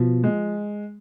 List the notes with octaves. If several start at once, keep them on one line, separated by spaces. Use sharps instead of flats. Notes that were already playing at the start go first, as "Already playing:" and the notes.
Already playing: B2 F3
G#3